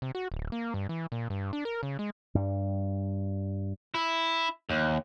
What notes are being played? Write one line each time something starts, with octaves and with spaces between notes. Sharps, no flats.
C3
F#4
D1
A#3
G2
E3
A#2
G2
D4
A#4
C#3
G#3
G2 G3
E4
D#2